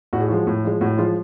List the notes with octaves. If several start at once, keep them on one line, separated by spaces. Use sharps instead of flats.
A2 F#4
G#4
F3 G#3 F#4
A2
F3 G#3
A2 F#4
F3 G#3 F4